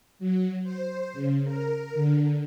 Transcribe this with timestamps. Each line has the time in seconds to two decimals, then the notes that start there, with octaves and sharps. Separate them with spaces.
0.19 F#3
0.63 C5
1.13 C#3
1.44 A#4
1.94 D3